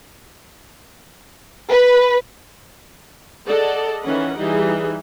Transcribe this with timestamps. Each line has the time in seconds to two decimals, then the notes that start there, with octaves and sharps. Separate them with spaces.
1.70 B4
3.47 G#4 A4 D5 D#5 F#5
4.03 D#3 E3 C#4 B4 F#5
4.38 E3 G3 D#4 G#4